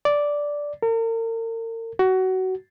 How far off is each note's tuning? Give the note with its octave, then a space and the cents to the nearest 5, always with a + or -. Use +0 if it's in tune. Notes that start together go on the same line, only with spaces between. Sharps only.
D5 -5
A#4 -40
F#4 +20